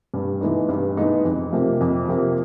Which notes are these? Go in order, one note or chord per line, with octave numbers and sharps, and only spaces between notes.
G2
E3 G#3 B3 D#4
G2
E3 G#3 B3 D#4
F2
C3 F3 A#3
F2
C3 F3 A#3